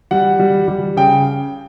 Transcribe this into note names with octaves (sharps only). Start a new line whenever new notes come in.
G3 F#5
G3
G3
C#3 G5